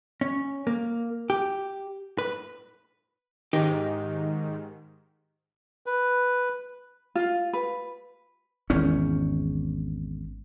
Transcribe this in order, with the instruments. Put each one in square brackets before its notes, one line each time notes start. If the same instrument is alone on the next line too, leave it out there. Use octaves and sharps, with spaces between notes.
[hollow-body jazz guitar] C#4
A#3
G4
B4
[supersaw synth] G#2 D#3 [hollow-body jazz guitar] D#4 G4
[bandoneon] B4
[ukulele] F4
B4
[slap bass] G#1 E2 G#2 C#4